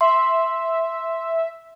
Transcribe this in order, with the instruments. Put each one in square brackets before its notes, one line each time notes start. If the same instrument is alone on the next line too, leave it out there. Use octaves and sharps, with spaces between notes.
[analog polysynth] E5 [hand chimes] C6